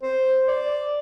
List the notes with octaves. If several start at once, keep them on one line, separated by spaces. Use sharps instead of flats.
C5
D5